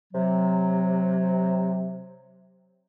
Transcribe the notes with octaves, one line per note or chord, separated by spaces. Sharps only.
C3 F#3